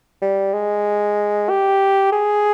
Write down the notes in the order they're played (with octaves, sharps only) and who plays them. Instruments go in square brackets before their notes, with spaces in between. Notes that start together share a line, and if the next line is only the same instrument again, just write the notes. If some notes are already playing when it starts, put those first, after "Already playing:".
[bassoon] G3
G#3
G4
G#4